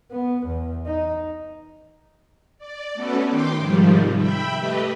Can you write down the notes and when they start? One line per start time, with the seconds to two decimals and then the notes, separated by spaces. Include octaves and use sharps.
0.11 B3
0.46 E2
0.86 D#4
2.58 D5
2.94 A3 B3 C#4 F#4 A4 B4
3.28 D#3 G5 C6 D6
3.57 G#2 C3 D#3 F3 G3
4.16 E5 G5 B5
4.57 A3 G4 B4 D#5